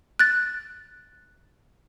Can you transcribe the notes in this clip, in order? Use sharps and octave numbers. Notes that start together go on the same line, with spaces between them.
F#6 A6